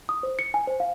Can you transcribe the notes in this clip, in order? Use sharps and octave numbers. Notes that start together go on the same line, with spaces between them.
D#6
C5
C#7
G#5
C5
F5